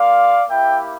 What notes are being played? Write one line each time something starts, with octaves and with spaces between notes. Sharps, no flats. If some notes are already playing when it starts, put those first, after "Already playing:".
Already playing: A#3 F4 D5 F5
A#3 E4 G4 E5 G5